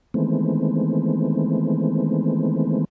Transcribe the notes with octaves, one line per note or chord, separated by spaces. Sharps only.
D#3 E3 G#3 A3 B3 C4